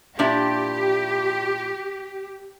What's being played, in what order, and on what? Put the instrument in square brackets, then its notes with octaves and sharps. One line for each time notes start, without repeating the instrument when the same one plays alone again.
[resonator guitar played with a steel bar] A#2 D4 E4 [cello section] G4